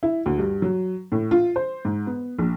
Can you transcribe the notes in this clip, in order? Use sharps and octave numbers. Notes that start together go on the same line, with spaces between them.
E4
D2
G2
F#3
A2
F4
C5
G#2
B3
A#1